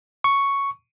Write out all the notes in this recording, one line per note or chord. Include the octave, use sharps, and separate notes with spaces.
C#6